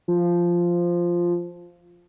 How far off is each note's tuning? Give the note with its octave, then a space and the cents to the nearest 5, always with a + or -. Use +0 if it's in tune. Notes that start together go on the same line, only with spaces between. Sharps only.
F3 -5